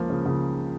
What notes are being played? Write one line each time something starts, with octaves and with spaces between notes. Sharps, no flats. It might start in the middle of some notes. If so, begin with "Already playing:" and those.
Already playing: C#2 F3 A#3
C#3
C#3